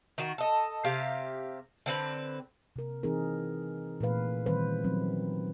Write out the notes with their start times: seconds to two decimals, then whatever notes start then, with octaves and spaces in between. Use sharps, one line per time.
0.18 D#3 F#4
0.38 A4 D#5
0.85 C3 G4 F5
1.86 D3 C4 B4
2.76 C3 A#4
3.03 E3 C4 D#4 G#4 A#4
4.01 A#2 E3 A3 B4 F5
4.46 D#3 E3 G3 C4 B4 C5
4.84 F3 F#3 C4 C#4 D#4